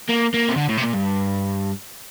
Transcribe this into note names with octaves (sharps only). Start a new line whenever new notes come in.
A#3
A#3
C3
D3
A2
C3
A#2
G2